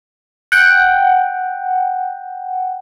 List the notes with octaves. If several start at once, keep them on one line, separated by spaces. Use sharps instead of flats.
F#5 G5